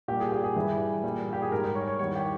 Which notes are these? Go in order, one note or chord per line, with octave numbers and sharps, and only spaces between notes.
A#2 G3 G4
G#4
G4
G#4
G2 E3 G3
A#2 G3
G4
G#4
G#2 G3 A#4
C#5
C#5
E2 D#3 G3 C#5
G4